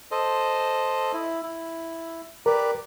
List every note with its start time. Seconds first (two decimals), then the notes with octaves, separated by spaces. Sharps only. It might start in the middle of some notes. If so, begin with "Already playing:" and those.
0.11 A4 C5 D#5
1.13 E4
1.42 E4
2.46 G4 A#4 B4 D5